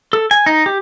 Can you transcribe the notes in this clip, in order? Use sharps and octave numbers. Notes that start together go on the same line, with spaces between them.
A4
G#5
D#4
G4